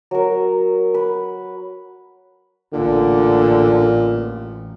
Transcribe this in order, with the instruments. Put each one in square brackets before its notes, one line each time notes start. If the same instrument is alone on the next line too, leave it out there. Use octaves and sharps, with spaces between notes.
[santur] F#3 A#4
B4
[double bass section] A1 [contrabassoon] A#2 [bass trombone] D3